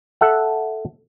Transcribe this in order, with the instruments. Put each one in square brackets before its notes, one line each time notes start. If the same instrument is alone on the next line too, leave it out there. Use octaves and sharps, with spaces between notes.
[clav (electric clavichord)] A4 E5 F#5